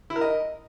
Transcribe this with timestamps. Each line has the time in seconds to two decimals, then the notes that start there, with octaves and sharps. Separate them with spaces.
0.10 E4
0.16 A#4
0.21 D#5